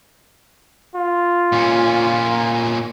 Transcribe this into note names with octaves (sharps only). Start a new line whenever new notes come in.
F4
A#2 C#4